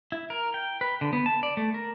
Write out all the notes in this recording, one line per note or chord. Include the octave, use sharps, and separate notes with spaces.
E4
A#4
G5
B4
D3
B3
A5
D5
A3
A#4